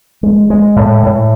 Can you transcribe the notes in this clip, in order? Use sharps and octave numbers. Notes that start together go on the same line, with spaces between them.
G#3
G#3
A2
A2